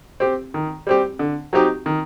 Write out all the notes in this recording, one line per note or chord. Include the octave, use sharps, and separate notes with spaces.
C4 G4
D#3
G3 C4 G4
D3
F#3 C4 D#4 G4
D#3